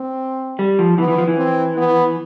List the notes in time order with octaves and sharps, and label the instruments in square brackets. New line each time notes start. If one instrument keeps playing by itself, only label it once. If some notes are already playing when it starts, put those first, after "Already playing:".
Already playing: [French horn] C4
[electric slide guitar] G3
F3
[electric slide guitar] E3 [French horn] B3
[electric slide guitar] E3
F3
E3
[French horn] C4
B3